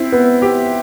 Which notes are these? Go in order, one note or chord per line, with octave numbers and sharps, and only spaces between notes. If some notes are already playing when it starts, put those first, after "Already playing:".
Already playing: C4 E4
B3
G4